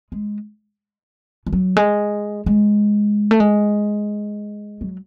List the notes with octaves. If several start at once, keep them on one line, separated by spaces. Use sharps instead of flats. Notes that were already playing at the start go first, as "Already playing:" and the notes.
G#3
E3
F#3
G#3
G#3
A3
G#3
F#3